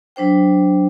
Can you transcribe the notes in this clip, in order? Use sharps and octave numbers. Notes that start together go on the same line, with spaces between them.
F#3 D4 C5 G5